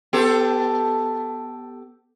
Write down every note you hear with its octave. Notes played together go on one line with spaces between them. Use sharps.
B3 G4 A4